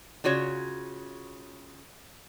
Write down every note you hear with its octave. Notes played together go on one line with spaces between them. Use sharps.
C#3 F4 F#4 C#5